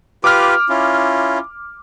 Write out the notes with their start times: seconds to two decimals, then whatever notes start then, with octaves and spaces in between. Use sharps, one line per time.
0.24 F4 G4 B4 D6 F6
0.69 C#4 E4 F4